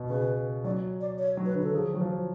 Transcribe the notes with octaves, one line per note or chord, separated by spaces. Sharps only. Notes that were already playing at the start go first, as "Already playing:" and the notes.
Already playing: B2
C#3 B4
F#3 D5
D5
C#5
F#3
B4
D3
A4
F3 G#4
F#3
F3